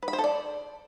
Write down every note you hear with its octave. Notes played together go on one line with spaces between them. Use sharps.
B4
B5
C5
A4
D5